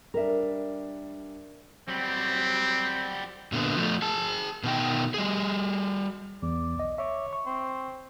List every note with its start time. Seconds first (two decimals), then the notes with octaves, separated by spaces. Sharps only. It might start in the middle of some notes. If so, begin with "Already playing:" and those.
0.14 G3 D4 A#4 E5
1.88 F#3 G3 C4
3.52 A#2 D3 B3
3.77 F3 A3 F4
4.02 G#4 A5
4.63 B2 D#3 G5
5.14 G3 G#4
6.43 E2 D5
6.76 B1 D#5
6.98 C#5 E5 D6
7.33 C#6
7.46 C4